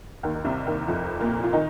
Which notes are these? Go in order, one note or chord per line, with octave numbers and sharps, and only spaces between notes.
D#2 D#3
D#3
C2 C3
D#2 D#3
F2 F3
A#2 A#3
F4
D#3 D#4